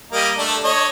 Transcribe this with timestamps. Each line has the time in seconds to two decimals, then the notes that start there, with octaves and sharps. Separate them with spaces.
0.12 G3 A#3 D#5
0.39 A3 D4
0.64 D4 C#5 D#5